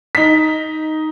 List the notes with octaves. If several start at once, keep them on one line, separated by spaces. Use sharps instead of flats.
D#4 B6